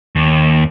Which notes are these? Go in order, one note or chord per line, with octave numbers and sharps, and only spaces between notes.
D#2